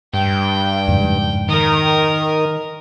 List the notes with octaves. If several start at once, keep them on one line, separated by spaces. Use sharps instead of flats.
G2 G5
F2 G#2 C#3
D#3 A#4 D#6